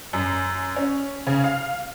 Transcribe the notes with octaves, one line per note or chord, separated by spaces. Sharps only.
F#2
C#4
C#3
F5